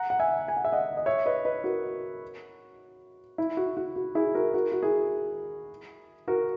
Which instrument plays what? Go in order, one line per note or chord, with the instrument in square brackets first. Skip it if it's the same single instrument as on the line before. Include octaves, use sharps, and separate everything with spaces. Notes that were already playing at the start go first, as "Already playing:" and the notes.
Already playing: [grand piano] F#5 A#5
F#5
E5 G#5
G#5
F#5
E5
D#5 F#5
D#5
C#5 E5
B4 D#5
B4 D#5
F#4 A#4
E4
F#4
F#4
F#4
E4 G#4
F#4 A#4
F#4 A#4
F#4
E4 G#4
F#4 A#4